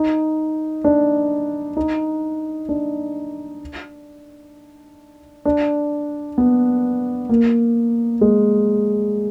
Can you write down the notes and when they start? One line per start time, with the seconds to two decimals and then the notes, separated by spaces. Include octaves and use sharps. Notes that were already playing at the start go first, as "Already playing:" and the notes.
Already playing: D#4
0.84 D4
1.77 D#4
2.69 D4
5.45 D4
6.38 B3
7.29 A#3
8.21 G#3